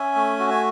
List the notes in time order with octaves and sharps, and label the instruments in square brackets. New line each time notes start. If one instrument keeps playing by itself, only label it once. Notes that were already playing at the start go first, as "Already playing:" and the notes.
Already playing: [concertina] C#4 E5 G#5
A3
F#4
G#5